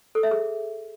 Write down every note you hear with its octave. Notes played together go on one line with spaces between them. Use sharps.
A4
E5
G#4